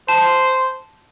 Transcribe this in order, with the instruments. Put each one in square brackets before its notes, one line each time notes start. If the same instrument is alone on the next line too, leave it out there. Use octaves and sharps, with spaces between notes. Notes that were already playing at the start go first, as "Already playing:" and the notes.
[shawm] C5 [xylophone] A5